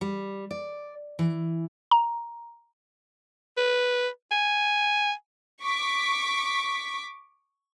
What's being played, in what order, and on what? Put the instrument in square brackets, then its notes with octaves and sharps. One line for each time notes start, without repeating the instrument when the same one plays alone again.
[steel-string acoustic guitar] G3
D5
E3
[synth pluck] A#5
[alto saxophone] B4
G#5
[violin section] C#6 D6 B6